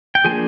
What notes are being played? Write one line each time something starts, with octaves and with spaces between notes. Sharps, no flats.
G5
F3 A#3 D4 G#4 G#5